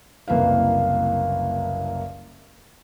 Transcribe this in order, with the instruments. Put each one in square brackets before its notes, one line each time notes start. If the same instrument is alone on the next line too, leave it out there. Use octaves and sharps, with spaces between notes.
[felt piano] F#1 C2 A#3 B4 F5